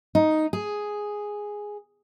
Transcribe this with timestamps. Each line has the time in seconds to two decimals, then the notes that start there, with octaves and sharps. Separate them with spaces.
0.15 D#4
0.53 G#4